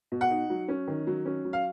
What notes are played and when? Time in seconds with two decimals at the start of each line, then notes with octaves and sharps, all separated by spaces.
0.12 B2
0.21 F#5
0.31 D#4
0.50 F#3
0.68 C#4
0.88 D#3
1.07 F#3
1.26 C#4
1.45 F#3
1.53 F5